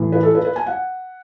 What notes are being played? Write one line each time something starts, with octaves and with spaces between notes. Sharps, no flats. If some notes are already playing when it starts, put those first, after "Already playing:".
Already playing: A2 E3
B4
A4
B4
B4
G#5
F#5